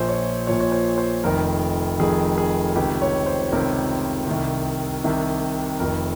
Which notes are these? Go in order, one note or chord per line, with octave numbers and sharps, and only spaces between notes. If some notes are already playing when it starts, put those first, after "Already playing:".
Already playing: A#1 A#2 F3 C5
C#5
A#1 A#2 F3 C#5
C#5
C5
C5
F1 F2 D#3 A#4
F1 F2 D#3 G#4
G#4
C#2 C3 D#3 G4
C#5
C5
C#2 C3 D#3 A#4
C2 C3 D#3
C2 C3 D#3
F1 F2 D#3 A#4